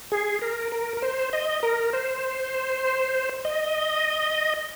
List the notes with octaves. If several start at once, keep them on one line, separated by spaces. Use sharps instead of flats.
G#4
A#4
A#4
A#4
C5
D#5
A#4
C5
D#5